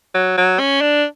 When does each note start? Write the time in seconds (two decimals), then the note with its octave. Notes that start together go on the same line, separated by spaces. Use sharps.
0.15 F#3
0.37 F#3
0.59 C#4
0.81 D4